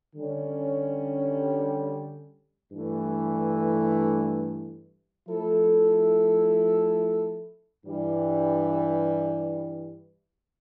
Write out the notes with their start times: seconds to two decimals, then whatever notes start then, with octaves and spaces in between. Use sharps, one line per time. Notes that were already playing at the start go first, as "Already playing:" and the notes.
0.15 D3 G3 C#4
2.72 G2 E3 A3
5.28 F3 A3 E4 A4
7.85 G2 E3 G3